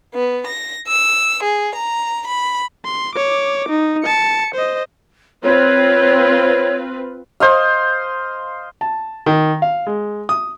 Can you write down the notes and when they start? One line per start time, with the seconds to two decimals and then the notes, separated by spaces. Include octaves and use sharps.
0.14 B3
0.46 A#6
0.87 E6
1.42 G#4
1.75 A#5
2.26 B5
2.85 C6
3.15 C#5 D6
3.69 D#4
4.04 A5 C#7
4.55 C5 D#5
5.43 C4 F4 B4 C#5
7.40 C5 D#5 F5
8.81 A5
9.26 D#3
9.62 F5
9.87 G#3
10.29 D#6